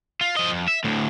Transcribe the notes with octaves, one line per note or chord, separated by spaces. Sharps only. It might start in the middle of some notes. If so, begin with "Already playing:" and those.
F4
F3 D#5
F2
E5
D2 A2